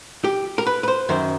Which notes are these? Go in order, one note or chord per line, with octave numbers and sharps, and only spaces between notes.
G4
A#4
B4
B4
C5
F#2 D#3 C5